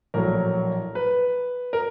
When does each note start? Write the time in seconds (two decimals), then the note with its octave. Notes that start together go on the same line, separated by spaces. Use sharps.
0.14 A#1 A2 F#3 A#4
0.95 B4
1.73 A#4